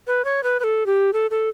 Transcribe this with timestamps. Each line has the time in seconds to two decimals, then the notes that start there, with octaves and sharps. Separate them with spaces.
0.07 B4
0.25 C#5
0.43 B4
0.60 B4
0.64 A4
0.86 G4
1.13 A4
1.31 A4